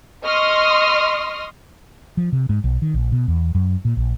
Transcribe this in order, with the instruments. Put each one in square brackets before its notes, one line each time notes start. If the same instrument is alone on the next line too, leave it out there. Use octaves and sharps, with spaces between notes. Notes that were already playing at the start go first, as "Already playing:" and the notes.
[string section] D#5 C6 C#6 D#6 F6
[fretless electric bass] F3
C3
G#2
B1
D#3
A#1
B2
E2
F#2
A#2
A#1